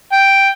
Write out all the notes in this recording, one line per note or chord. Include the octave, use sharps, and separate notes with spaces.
G5